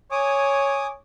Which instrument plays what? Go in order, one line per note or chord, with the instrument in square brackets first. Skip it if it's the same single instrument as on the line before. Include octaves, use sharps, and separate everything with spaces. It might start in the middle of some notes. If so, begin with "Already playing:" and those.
[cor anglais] C#5 [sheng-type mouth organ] G#5 D6 D#6